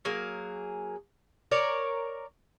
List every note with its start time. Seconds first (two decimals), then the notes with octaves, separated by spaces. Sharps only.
0.05 F#3 A#3 G#4
1.51 A#4 C#5 D5